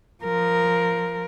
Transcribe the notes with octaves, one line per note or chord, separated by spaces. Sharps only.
F3 A#4